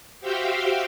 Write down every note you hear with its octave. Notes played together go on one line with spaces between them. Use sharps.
F#4 G4 C5 E5 F5 G5